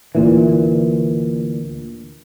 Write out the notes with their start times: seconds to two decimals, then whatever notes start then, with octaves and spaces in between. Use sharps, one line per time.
0.15 D2 A#2 E3